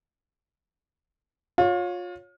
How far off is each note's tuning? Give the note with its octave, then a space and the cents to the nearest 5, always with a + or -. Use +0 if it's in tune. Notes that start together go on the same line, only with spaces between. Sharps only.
F4 +30 C#5 +0